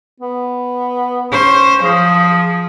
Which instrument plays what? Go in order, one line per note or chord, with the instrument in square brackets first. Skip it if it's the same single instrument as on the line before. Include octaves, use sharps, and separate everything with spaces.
[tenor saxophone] B3
[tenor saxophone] C#4 [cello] C5
[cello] F3 [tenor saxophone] G#4